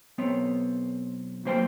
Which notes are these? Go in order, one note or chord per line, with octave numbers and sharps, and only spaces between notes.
B1 B3 C4 C#5
F#3 A#3 C5 C#5 G5 C6